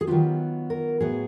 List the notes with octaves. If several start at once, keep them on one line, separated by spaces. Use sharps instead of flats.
G#4
D#3 F#3 B3 D4 F4 G4
A#4
A2 F#3 B3 G#4